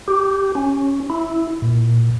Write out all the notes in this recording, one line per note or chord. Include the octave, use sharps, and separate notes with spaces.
G4
C#4
E4
A#2